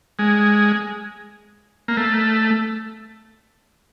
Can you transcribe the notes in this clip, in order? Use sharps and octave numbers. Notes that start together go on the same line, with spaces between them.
G#3
A#3
A3